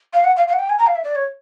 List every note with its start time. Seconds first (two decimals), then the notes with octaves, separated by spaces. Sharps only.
0.13 F5
0.24 F#5
0.37 F5
0.48 F5
0.53 F#5
0.59 G5
0.69 G#5
0.79 A#5
0.87 F5
0.95 E5
1.04 D5
1.15 C#5